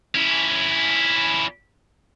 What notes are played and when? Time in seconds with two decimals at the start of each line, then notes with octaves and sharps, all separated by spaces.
0.15 C#4 E4